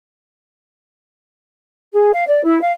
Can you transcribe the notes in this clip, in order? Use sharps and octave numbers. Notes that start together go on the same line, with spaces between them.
G#4
F5
D5
E4
F5